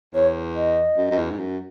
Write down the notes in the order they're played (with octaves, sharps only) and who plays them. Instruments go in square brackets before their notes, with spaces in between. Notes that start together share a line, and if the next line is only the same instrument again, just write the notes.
[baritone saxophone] E2 [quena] C#5
[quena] D#5
[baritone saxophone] F#2
F#2
E2
G#2
F#2